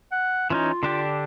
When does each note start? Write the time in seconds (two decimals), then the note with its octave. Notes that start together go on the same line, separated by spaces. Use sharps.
0.12 F#5
0.50 E3 C#4 D#4 F4
0.83 D3 D4 G4